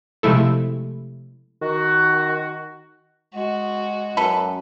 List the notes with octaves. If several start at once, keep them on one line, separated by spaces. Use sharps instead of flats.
C3 F3 G#3 A3 E4 A4
D#3 F#4
G#3 F#4
F#2 A4 B4